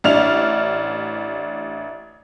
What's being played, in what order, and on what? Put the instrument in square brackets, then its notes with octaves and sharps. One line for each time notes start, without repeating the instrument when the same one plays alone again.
[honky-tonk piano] A1 D4 E4 F6 F7